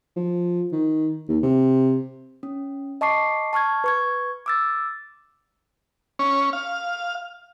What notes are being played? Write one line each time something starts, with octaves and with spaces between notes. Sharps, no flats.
F3
D#3
D#2
C3
C#4
D#5 A5 C#6 D6 C7
A5 C#6 F6 G#6
B4 C#6 G#6
D6 E6 A6
C#4
F5